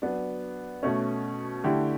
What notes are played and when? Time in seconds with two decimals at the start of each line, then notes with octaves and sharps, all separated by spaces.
0.02 F#3 B3 D4
0.83 B2 A3 C#4
1.64 D3 A3 E4 G4 G5